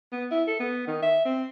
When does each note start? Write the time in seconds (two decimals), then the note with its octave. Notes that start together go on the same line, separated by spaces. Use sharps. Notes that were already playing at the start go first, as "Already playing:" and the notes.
0.13 B3
0.32 E4
0.48 A4
0.60 B3
0.87 D#3
1.03 E5
1.25 C4